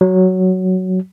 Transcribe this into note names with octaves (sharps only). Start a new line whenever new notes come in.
F#3